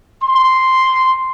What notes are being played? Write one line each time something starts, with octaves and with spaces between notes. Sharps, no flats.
C6